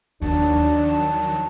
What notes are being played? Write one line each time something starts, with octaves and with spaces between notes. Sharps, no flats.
D#2 D#3 F3 F#3 D4 A5